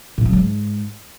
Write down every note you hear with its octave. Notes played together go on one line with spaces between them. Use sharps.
A2
F#3
G#2